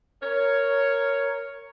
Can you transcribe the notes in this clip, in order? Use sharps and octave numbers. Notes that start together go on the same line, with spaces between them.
A#4 C#5